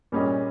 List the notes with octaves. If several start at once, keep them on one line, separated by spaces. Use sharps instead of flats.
A#2 G3 C#4 G#4 D#5